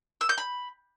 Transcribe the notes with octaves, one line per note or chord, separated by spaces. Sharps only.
E6
G6
B5